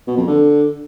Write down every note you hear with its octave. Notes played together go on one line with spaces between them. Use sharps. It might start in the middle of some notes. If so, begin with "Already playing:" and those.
B2
F2
D3